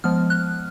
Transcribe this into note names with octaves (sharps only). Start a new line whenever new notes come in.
F3 G#3 B3 F6
F#6